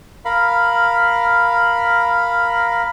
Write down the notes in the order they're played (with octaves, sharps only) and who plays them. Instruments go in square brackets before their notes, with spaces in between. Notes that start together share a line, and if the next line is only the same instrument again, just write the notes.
[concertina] A#4 F5 B5